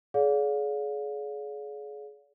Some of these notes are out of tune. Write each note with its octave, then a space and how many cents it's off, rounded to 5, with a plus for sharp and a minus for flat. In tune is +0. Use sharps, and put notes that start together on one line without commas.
G#4 +30 D5 -45 F5 +35